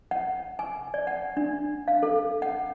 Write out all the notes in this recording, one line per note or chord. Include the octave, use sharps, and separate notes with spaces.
F#5
G#5
D5
F#5
D4
F5
A4
F#5